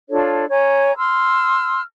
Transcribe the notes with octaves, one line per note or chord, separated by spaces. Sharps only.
D4 F4 A4 C#5
C#5 G#5 A#5
C6 E6 F6